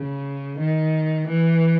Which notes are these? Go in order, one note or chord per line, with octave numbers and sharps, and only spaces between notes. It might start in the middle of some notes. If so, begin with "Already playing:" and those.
Already playing: C#3
D#3
E3